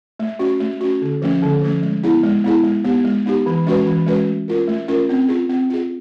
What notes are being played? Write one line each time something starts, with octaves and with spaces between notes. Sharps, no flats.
A3
C#4 F#4
A3
C#4 F#4
D3
F3 A3 C#4
D3
F3 A3 C#4
G#3
B3 E4 G#4
G#3
B3 E4 G#4
G#3
B3 D#4 G4
G#3
B3 D#4 G4
E3
G#3 C#4 F#4 B4
E3
G#3 C#4 F#4 B4
A3
C#4 F4 A#4
A3
C#4 F4 A#4
C4
F4 G#4
C4
F4 G#4